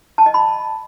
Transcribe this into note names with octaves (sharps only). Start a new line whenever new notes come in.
A5
D#5
B5